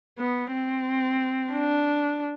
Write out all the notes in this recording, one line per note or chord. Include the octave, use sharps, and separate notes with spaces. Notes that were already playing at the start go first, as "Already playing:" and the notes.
B3
C4
D4